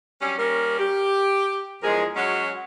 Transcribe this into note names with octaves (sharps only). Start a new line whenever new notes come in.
F#3 G3 C#4
G3 A#3 C#4 A#4
G4
E2 F3 G#3 G#4 A#4
F#3 G#3 C#4 F#4